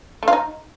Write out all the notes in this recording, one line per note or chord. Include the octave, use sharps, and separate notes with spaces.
A3
F4
D#4